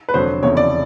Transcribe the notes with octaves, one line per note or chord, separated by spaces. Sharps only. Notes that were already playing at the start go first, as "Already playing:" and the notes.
B4
F1 F2 D3 F#3 C5
F1 E2 C#3 C#5
D5